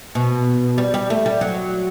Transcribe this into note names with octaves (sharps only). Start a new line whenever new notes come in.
B2
G3
G3
A3
G3
F#3